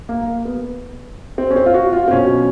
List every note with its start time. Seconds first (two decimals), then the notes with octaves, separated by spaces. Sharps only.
0.09 A#3
0.27 A#3
0.45 B3
1.38 C4
1.51 C#4
1.56 C4
1.66 F4
1.74 F#4
1.93 F4
2.08 C4
2.11 B2 F#3 C#4